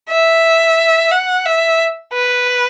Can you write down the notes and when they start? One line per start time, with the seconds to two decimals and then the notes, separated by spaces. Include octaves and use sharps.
0.10 E5
1.11 F#5
1.46 E5
2.13 B4